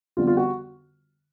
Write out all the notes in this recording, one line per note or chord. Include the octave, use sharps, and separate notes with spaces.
F2 D3 G3 B3 F4
F4
F#4